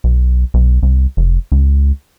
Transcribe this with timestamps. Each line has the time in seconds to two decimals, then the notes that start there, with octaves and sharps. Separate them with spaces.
0.04 B1
0.54 B1
0.83 C2
1.17 F1
1.52 C#2